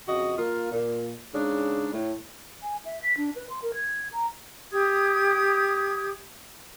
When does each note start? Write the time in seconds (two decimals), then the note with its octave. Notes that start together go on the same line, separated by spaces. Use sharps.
0.08 F2 C#3 F#4 D#5
0.38 A#3 F4
0.72 A#2
1.34 G#2 C#3 D4
1.93 A2
2.63 G#5
2.85 E5
3.03 B6
3.17 D4
3.36 B4
3.50 C6
3.62 A#4
3.75 G#6
4.12 A#5
4.71 G4 D#6 G#6